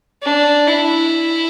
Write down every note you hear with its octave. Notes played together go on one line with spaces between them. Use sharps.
D4
E4